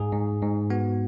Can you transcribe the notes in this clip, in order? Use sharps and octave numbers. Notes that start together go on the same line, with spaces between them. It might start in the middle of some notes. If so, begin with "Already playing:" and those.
Already playing: G#2 G#4
G#2
G#2
B3 F#4